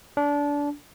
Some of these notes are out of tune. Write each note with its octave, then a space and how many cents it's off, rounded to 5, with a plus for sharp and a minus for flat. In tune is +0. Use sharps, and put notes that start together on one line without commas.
D4 -25